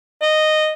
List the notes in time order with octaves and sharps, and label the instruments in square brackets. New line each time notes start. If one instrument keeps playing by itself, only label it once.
[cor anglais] D#5